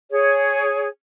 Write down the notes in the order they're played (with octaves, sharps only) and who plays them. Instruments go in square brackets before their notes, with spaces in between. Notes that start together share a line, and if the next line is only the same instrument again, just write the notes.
[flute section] G#4 C#5